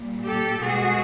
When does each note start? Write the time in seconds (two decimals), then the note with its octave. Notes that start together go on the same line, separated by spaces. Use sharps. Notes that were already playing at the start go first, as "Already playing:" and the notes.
Already playing: A#2 G3
0.24 G4 A4
0.60 B2 G#3 F#4 G#4